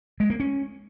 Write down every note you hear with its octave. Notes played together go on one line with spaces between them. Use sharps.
G#3
A#3
C#4